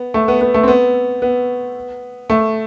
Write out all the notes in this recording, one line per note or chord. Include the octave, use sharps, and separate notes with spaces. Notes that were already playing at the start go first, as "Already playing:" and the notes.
Already playing: B3
A3
B3
B3
A3
C4
B3
B3
A3